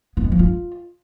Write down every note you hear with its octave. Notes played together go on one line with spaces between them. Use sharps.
B3
G#3
F3
F4